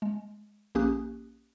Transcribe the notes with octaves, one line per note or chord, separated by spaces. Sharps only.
G#3
A#1 A#3 C#4 G4 D#6 F#6